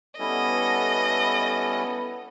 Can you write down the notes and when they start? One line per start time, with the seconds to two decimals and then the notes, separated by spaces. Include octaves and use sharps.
0.19 G3 B3 C#4 E4 A4 D#5